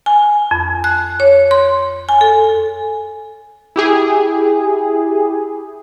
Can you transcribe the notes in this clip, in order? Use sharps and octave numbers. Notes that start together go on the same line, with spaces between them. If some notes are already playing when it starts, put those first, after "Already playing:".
G#5
F2
F#6
C#5
C6
G#5
A4
E4 G4 G#4